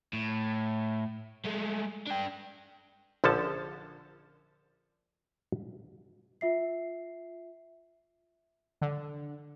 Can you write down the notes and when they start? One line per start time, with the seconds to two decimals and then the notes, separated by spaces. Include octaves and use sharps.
0.13 A2
1.45 G#3 A3
2.07 D4 G5
3.24 A#1 D3 F3 C#4 A4 A5
6.41 F4 E5 C7
8.81 D3